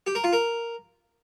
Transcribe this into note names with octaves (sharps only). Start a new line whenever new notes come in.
G4
A#4
F4
A#4